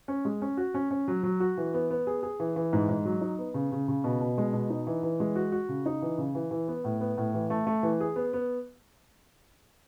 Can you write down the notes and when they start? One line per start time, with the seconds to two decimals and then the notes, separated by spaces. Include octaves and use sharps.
0.08 C#4
0.25 G#3
0.42 C#4
0.57 F#4
0.74 C#4
0.91 C#4
1.08 F#3
1.23 F#3
1.40 F#4
1.57 E3
1.74 B3
1.90 B3
2.07 G#4
2.23 G#4
2.40 E3
2.56 E3
2.73 G#2
2.89 G#2
3.05 F#3
3.21 D#4
3.39 B3
3.54 C#3
3.72 C#3
3.88 C#3
4.04 B2
4.20 B2
4.38 G#3
4.53 B2
4.70 D#4
4.87 E3
5.03 E3
5.20 G#3
5.35 F#4
5.52 F#4
5.69 C#3
5.86 D#4
6.02 E3
6.18 C#3
6.35 E3
6.51 E3
6.68 B3
6.84 A2
7.01 B3
7.17 A2
7.34 E3
7.50 A3
7.67 A3
7.83 E3
8.00 G#4
8.16 B3
8.33 B3